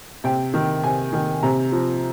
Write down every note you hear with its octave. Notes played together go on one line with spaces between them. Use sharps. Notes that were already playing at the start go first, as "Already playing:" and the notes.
C3 G5
D#3
C3 G#5
D#3
C3 A#5
F3